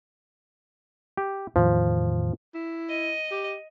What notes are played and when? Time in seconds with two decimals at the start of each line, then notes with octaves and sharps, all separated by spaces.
1.17 G4
1.56 E2 A2 D#3 F3
2.54 E4
2.89 D#5
3.31 G4